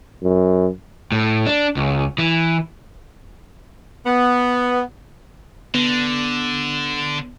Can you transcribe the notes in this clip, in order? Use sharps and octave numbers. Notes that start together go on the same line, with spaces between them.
F#2
A2
D4
C#2
E3
B3
D3 B3